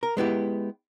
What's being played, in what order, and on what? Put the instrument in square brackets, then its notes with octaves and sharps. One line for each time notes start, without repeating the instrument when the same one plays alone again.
[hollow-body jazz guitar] A#4
G#3 B3 E4 G4